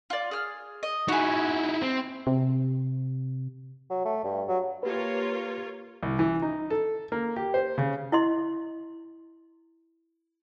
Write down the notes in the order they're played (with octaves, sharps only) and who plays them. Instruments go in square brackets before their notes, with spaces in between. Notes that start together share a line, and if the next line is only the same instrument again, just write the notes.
[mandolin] F4 D5
G#4 F6
D#5
[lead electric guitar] D#4 E4 [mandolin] F#4 G#4
[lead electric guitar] C4
[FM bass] C3
[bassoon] F#3
A3
G2
F#3
[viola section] A#3 F4 C#5 [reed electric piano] G4 B4
[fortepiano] C2
E3
D#4
A4
A#3
G4
C5
C#3
[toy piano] E4 D#5 C6